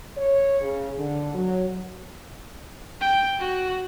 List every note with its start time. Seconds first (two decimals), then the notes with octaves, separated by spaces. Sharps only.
0.18 C#5
0.61 C#3
0.98 D3
1.34 F#3
3.01 G5
3.39 F#4